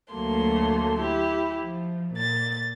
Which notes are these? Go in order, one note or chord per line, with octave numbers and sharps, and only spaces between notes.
D2 F#3 A3 A#3 C6
E4 G4
F3
A#2 A6